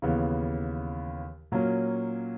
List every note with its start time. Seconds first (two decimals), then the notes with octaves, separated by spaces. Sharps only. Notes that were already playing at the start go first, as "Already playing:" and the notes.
0.02 D#2 C#3 E3 B3
1.52 A#2 F#3 A#3 C#4